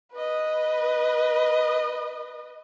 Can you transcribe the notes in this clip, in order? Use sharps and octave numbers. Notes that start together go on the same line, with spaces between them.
B4 D#5